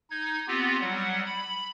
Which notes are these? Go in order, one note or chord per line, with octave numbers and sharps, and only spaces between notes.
D#4 G#6
B3 C4 F4 G4
F#3 G3 F#5
B5